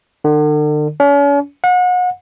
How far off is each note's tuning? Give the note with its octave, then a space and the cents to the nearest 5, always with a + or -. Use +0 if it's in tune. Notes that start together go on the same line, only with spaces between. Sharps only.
D3 +40
C#4 +40
F#5 -35